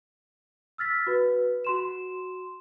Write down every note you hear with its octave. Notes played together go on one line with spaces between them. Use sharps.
E6 F6 A6 B6
F#4 B4
F#4 C6 E7